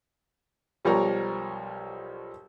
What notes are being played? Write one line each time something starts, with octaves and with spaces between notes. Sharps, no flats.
B1 F3 G3 A#4 C#5 A#5